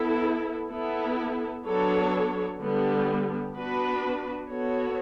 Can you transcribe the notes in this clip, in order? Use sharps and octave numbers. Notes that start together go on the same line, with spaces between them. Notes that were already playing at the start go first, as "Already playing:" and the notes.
Already playing: B3 E4 A4
B3 E4 A4
F#3 B3 D4 A4 C#5
D3 G3 B3
B3 D4 F#4 B4
B3 F#4 A4 C#5